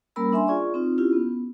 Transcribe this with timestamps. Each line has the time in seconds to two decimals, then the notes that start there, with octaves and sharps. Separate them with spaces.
0.16 G3 A#3 C#4 A#4 B5 E6
0.32 D4 E5 G#5 C6
0.47 F4 G#4 D5 C#6
0.74 C4 D#4 F4
0.98 C#4 E4 F4 G4
1.13 B3